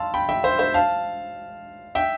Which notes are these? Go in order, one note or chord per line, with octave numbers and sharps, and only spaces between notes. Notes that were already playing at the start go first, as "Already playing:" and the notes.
Already playing: F5 A5 C6 E6
G5 B5
E5 G5
C5 E5
C5 E5
F5 A5
E5 G5